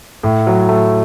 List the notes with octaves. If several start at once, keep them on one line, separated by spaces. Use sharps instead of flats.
A2
F#3
A3